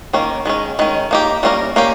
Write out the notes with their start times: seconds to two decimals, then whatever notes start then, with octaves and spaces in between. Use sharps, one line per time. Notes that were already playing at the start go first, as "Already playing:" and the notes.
0.13 D#3 A#3 C#4
0.46 D#3 G#3 C#4
0.79 D#3 G#3 C#4
1.11 A#3 D#4 G4
1.43 G3 A#3 C#4 F4 A#4
1.76 A#3 C#4 G4